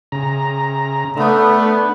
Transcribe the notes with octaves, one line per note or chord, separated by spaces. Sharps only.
C#3 A#5
A3 B3 D4